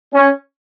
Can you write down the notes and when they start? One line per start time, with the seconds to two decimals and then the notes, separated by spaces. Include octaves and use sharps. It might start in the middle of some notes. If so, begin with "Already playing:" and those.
0.14 C#4